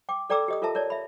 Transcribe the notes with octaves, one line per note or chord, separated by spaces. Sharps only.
G5 D6
A4 D5 G5 A#5 D6 E6
G4 D#5 D#6
F4 A4 A#4 E5 A5 A#5
A#4 C#5 D5 A5
E5 B5